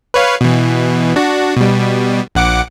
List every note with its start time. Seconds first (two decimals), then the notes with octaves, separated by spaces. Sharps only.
0.14 B4 C#5 F5
0.41 B2 E3
1.16 D4 F#4
1.57 B2 G3
2.35 A#1 F#5 D6